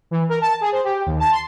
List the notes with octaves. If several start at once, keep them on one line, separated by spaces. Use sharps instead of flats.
E3
A#4
A5
G#4
C5
G4
D#2
A5
C6